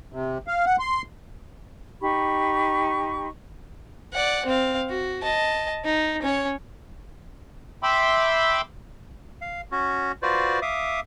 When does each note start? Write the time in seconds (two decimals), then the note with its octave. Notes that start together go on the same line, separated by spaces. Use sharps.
0.13 C3
0.47 F5
0.66 F#5
0.79 C6
2.00 D#4 G4 B5 C#6
4.13 D5 F#5
4.45 C4 F5
4.89 F#4
5.23 D#5 A5
5.85 D#4
6.22 C#4 C#5
7.83 E5 G5 B5 C6 D6 E6
9.41 F5
9.72 C#4 F#4
10.22 F4 F#4 B4 C5 D5
10.62 E5 F5 D6 D#6